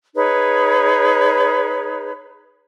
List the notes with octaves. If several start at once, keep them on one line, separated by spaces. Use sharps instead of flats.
D#4 G#4 B4 C#5